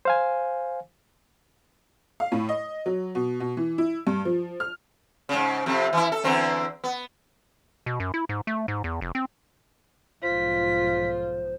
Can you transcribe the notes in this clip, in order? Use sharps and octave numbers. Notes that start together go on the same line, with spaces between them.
C5 F5 G#5
F5
A2
D#5
F#3
B2
B2
E3
E4
G2
F3
F6
G#2 C#3
F2 C3
E3 E4
A4
E2 D3 C4
B3
B2
F#2
E4
G#2
A3
G#2
E2
F1
C4
B1 G#2 F3 F4 C5 B6